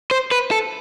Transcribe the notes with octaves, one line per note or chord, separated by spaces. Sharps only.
C5
B4
A4